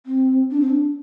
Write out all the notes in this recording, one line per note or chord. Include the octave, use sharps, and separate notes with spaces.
C4
D4
C4
D4